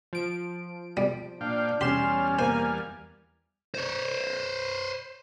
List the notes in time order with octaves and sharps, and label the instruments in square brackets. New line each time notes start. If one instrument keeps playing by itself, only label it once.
[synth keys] F3 D7
[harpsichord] G3
[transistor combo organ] A#2 F5 G5 [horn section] D4
[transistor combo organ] E2 G3 F6 [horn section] C#4 [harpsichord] G4 [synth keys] C6 E7
[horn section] A#3 [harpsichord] C5 [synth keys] G#5
[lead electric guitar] C5 C#5